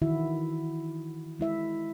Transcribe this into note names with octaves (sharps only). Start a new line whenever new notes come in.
D#3 E3 E4 F#4 E5
G#3 E4 E5